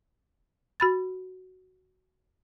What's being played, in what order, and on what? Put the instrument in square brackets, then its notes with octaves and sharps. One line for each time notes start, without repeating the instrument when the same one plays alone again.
[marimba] F#4 B5 A6